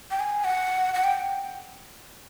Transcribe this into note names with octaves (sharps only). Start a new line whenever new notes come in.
G5
G#5
F#5
F#5
G5